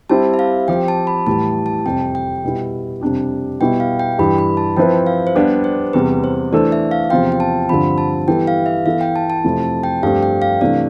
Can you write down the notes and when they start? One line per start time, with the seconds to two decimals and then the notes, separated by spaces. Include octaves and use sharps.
0.10 G3 C4 E4 G4 A5
0.34 E5
0.39 F5
0.68 F3 C4 G4 G5
0.88 A5
1.07 B5
1.27 A2 E3 G3 A5
1.66 A5
1.85 F2 C3 G3 G5
2.15 G5
2.44 B2 G3 B3 E4
3.01 F2 C3 G3 D4 G4
3.60 B2 G3 B3 E4 G4 G5
3.80 F5
3.99 G5
4.19 G2 E3 G3 B5
4.38 B5
4.57 A5
4.77 F3 C4 E4 B4 G5
5.07 F5
5.27 C5
5.35 G3 B3 D4 G4 D5
5.64 C5
5.93 E2 C3 G3 B4
6.24 C5
6.52 E3 A3 D4 A4 C5 D5
6.72 E5
6.91 F5
7.10 E2 C3 F3 C4 F4 G5
7.32 G5
7.40 A5
7.69 G2 D3 F3 C4 F4 B5
7.98 A5
8.28 E3 G3 B3 E4 A4 G5
8.47 F5
8.66 E5
8.86 E3 B3 E4 A4 F5
9.01 G5
9.16 A5
9.30 A5
9.44 F2 C3 F3 A3 E4
9.63 A5
9.83 G5
10.03 G2 F3 A3 C4 G4 F5
10.23 G5
10.42 F5
10.61 C3 E3 A3 D4 D5